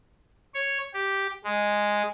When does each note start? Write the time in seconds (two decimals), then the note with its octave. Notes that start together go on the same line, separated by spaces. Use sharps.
0.55 C#5
0.94 G4
1.44 G#3